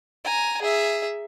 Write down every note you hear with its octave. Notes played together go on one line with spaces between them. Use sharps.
G#5 A#5
G#4 E5